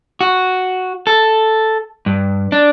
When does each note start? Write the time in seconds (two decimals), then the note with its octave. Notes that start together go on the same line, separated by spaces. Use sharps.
0.21 F#4
1.07 A4
2.06 G2
2.52 D4